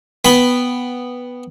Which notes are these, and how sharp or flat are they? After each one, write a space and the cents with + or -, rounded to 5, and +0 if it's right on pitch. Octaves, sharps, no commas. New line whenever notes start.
B3 +0 G5 +0 B5 +5